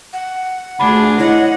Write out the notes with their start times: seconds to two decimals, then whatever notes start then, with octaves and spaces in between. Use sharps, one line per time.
0.13 F#5
0.79 D2 D4 F4 G#4 B5 G#6
1.19 E4 C#5 D#5 F#5